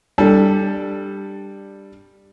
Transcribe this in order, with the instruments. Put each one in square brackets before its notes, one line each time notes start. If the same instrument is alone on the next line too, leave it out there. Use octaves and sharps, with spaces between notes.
[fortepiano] G3 D4 A4